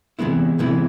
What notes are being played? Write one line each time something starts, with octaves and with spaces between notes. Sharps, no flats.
C3 E3 G#3 B3 E4
C3 E3 G#3 B3 E4